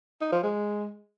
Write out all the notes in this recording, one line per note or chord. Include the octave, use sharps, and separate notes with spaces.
D#4
F3
G#3